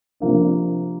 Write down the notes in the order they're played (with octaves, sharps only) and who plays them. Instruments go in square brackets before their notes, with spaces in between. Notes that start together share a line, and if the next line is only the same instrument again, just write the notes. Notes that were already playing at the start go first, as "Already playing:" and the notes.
[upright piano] C3 F3 A#3 D4